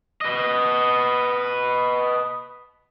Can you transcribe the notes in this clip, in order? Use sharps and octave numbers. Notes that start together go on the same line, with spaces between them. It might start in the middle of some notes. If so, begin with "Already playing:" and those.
B4 D#5